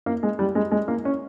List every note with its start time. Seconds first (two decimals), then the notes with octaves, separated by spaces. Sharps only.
0.06 A#3
0.23 G#3
0.39 G3
0.55 G#3
0.72 G#3
0.88 A#3
1.05 C#4